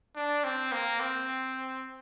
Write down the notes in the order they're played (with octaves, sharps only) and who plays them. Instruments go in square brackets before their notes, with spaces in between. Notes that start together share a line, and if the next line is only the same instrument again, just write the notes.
[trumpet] D4
C4
A#3
C4